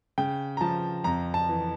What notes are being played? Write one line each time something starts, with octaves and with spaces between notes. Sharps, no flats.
C#3 G5
A#5
F3 A5
F2 A#5
A5
E3